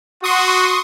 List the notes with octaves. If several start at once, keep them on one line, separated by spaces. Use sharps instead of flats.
F#4 C6 C#6 D#6